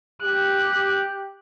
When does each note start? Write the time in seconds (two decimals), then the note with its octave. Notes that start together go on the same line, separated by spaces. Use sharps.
0.22 G4 F#6